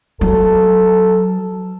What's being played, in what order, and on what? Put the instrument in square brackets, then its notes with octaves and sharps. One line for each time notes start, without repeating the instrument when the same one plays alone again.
[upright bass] F#3 [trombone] A4